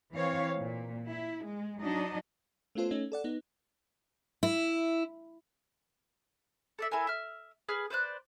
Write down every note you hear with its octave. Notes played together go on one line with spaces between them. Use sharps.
E3 C4 C#5 F5
A#2
E4
G#3
F#3 D4 D#4 D#5
A3 B3 C#4 F4 A4 C5
A3 C#4 D#4
A4 D5 F#5
B3 D#4
E4
A4 D5 E5
E4 A4 A#4 G#5
E5 F6
G#4 B4 F6
B4 C5 D5 F#6